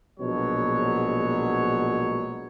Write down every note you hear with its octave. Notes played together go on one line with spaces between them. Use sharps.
A#1 B2 F#3 G#3 C#5